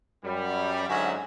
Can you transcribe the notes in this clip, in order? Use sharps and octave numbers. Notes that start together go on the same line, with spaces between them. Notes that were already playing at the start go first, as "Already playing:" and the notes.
F#2 G3
G#2 D3 F#3 C#4 F#4 E5